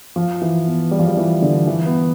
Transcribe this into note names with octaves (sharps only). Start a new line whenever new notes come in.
F3
E3
B3
G3
F3
G3
E3
D3
E3
B3